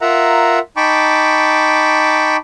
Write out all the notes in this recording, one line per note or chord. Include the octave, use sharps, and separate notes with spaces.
F4 A#4 E5 F#5 A#5
D#4 G5 A5 B5 C#6 D6